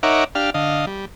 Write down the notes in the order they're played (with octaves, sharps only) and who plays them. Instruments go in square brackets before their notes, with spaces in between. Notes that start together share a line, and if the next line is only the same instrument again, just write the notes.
[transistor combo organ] D#4 A#4 C#5 E5 F#5 D6
D4 G4 F5 F6
D3 D#5 F5
G3